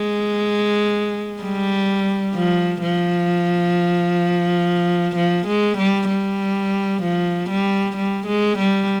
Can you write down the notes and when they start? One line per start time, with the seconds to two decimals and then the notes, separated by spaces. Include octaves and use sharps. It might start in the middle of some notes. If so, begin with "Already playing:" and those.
Already playing: G#3
1.43 G3
2.35 F3
2.82 F3
5.16 F3
5.47 G#3
5.78 G3
6.09 G3
7.02 F3
7.50 G3
7.97 G3
8.27 G#3
8.59 G3